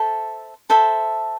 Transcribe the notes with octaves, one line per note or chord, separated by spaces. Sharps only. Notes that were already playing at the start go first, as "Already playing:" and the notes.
Already playing: A4 C5 E5 A5
A4 C5 E5 A5